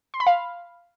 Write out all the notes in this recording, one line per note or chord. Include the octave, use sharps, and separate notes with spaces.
C6
B5
F5